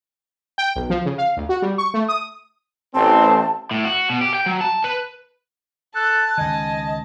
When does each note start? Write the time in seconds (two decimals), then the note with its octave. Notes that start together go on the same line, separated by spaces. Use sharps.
0.58 G5
0.76 B1
0.90 F3
1.06 C#3
1.18 F5
1.37 D2
1.49 F#4
1.62 G3
1.78 C#6
1.94 A3
2.08 D#6
2.95 A1 C4 A5
3.71 A2
3.85 F#4
4.10 B2
4.21 G4
4.35 G5
4.46 F#3
4.61 A5
4.84 B4
5.95 A4 A5 F#6
6.38 C#2 D#3 D#5 G#5